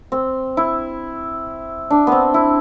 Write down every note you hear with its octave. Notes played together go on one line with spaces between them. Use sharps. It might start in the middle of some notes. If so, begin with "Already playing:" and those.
C4
E4
D4
B3 C4
E4